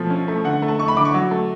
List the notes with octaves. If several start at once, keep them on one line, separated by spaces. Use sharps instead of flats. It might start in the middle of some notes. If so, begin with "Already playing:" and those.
Already playing: B2 F3 A3
C#4
A3
D3 F#5
A3
A5
A3 C#6
B5
D3 D6
C#6
F#3
A3